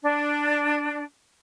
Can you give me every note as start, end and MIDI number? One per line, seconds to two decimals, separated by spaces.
0.02 1.02 62